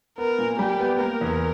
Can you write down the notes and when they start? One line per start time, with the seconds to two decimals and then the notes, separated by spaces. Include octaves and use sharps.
0.18 B3 A#4
0.39 A#2
0.59 G3 G4
0.80 B3
1.00 A#3 A#4
1.21 E2